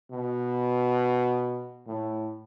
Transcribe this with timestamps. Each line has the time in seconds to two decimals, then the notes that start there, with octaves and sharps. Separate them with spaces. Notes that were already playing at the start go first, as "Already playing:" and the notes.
0.11 B2
1.87 A2